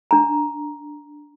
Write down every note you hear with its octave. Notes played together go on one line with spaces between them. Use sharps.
D4 A#5